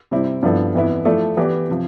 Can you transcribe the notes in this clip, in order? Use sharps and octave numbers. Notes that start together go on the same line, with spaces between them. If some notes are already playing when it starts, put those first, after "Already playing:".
C3 G3 C4 E4
G2 F3 B3 E4 A4
F2 E3 B3 E4
F3 A3 E4 A4 D5
E3 B3 E4 G4 D5
C3 F3